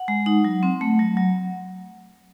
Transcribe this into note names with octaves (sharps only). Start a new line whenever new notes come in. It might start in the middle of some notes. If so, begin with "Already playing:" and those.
Already playing: F#5
G#3
D#4
F#3
C4
A3
F#3
F#3